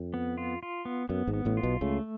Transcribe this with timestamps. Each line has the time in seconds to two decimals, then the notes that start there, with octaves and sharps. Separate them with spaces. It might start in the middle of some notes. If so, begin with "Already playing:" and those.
Already playing: F2
0.14 B3
0.38 F4
0.63 F4
0.85 B3
1.09 F#2 B3
1.27 G#1 G#2
1.34 B3
1.45 A1 A2
1.57 F4
1.63 B1 B2
1.81 C#2 C#3 A3